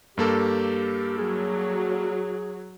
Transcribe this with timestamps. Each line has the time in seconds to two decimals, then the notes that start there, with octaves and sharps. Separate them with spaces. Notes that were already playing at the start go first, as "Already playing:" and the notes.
0.18 G2 A#3 G4 A4
1.18 F#3 G#4